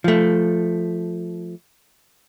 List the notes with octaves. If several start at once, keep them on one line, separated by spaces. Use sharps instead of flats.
F3 A3